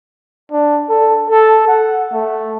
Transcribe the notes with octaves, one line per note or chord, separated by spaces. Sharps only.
D4
A4
A4
F#5
A3